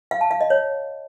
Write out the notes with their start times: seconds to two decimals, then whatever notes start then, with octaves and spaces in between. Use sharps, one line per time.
0.11 F5
0.21 A5
0.31 F5
0.41 D#5
0.50 C#5